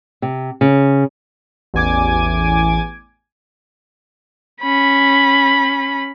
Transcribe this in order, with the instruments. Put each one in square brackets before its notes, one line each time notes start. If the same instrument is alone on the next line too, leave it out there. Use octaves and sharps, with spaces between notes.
[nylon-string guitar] C3
C#3
[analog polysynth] A1 E2 G#5 D6 G#6
[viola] C#4 B5